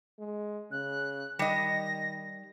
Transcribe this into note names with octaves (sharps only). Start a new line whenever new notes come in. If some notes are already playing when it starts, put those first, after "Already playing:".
G#3
C#3 F#6
D#3 G3 D#5 A#6